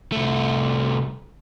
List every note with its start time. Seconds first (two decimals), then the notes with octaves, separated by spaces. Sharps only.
0.12 C2 A3